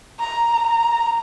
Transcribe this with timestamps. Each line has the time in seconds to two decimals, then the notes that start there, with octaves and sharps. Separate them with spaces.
0.20 A#5
0.67 A#5